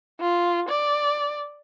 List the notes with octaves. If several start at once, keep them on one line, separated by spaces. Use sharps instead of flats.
F4
D5